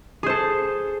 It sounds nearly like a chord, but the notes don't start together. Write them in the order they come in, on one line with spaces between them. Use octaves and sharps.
G#4 C5 A4